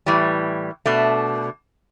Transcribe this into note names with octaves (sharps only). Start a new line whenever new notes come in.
A2 E3 G3
B2 A3 D4